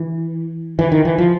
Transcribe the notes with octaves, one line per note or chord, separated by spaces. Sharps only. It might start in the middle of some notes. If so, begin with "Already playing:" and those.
Already playing: E3
E3
D#3
E3
F3